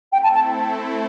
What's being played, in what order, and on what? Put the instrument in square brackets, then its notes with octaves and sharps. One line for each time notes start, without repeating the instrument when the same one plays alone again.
[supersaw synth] A3 C4 E4 A4 [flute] G5
[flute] A5
A5